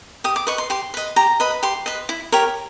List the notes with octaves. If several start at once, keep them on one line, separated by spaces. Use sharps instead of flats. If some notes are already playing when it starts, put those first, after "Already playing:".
G4 D#6
D6
B4 D#5 C#6
C6
G4 C6
B4 D#5
G4 A#5
B4 D#5 B5
G4 C6
B4 D#5
E4
G4 A#4 C#5